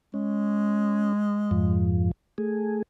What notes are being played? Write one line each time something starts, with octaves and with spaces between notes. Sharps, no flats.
G#3 C#4
F2 G#2 F3
A3 G#4